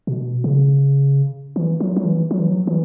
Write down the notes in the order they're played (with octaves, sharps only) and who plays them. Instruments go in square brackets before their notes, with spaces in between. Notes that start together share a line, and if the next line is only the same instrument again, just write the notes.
[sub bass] B2
C#3
E3
F#3
F#3
E3
F#3
E3
F#3
E3